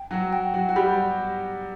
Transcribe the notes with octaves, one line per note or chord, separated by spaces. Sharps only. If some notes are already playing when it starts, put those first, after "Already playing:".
Already playing: G5
F#3 F#4
G5
F#3 F#4
F#4
G3 G4 B5